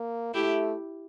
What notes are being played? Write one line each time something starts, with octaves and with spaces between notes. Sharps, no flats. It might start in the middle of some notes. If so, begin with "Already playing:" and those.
Already playing: A#3
A3 E4 G4